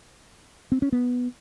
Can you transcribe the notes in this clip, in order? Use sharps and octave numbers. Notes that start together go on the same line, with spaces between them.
C4
C#4
B3